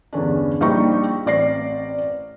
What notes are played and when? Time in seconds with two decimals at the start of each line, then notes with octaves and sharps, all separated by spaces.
0.13 E2 G2 D3 C#4 D4
0.61 A#1 F3 G3 D#4 G5 C#6
1.26 A1 C4 D5 A#6 C7